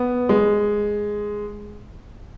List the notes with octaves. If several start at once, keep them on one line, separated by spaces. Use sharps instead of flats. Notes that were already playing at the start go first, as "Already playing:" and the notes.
Already playing: B3
G#3